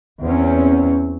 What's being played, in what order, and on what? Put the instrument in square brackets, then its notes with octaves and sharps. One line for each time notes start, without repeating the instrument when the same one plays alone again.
[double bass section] E2 C4 C#4